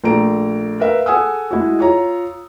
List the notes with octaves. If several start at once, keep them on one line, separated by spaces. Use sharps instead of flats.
A#1 A3 A#5 D7
A#4 B4 E5 F5
G#4 A4 F#5 G#5 D#6 E6
G#3 E4 F#4
F4 C#5 A#5